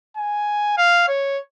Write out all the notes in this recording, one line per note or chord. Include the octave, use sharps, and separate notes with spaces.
G#5
F5
C#5